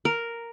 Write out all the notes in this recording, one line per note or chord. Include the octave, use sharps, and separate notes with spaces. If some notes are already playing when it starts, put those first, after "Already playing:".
A#4